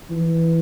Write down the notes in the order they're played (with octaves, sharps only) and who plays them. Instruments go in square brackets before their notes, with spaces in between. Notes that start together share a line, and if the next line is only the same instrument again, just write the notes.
[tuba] E3